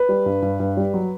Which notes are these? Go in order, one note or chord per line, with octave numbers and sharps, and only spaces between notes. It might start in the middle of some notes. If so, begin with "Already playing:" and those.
Already playing: B4
G3
G2
G2
G2
G3
F#3